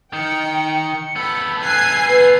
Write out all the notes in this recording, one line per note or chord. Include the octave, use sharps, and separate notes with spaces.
D#3 D#4 G5 C#7
B3 A4 B5
G#5 F#6 G#6 C7
B4